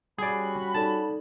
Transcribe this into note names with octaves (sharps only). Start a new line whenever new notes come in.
G3 C#4 F#4 G#4 D5 B5
D#4 A4 D5 A5